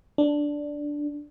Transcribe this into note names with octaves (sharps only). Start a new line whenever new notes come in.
D4